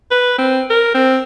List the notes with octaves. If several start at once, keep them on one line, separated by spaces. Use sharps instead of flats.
B4
C4
A#4
C4